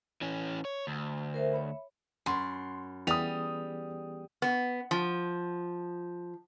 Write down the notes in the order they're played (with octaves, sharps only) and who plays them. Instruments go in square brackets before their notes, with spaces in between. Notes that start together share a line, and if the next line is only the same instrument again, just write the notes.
[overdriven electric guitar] E3 C#4
C#5
D2
[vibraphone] A#4 C5 E5
C#5 E5 B5
[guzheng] F#2 [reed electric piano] B5 [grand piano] C6
[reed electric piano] E3 B3 G#4 [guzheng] G3 [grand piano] D#6 F7
[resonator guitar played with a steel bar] B3
F3